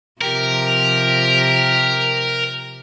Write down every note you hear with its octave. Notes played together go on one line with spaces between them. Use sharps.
C3 F3 G4 A#4